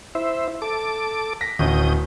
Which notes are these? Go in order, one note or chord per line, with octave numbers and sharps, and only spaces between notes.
E4 C5 E5
A4 D6
A#6 B6
D1 C#4 D#6 G6